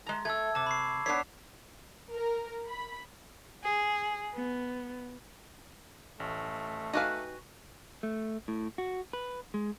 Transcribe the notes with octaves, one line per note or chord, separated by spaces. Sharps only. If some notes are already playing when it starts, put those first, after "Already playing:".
G#3 A#5
A3 E6 G#6
C3 A5 D6
B5 C#6 C7
B3 D4 C#5 B6 C7
A#4
B5
G#4
B3
A1 A3
D#4 F#4 G4 B4 F5 G#5
A3
A2
F#4
B4
G#3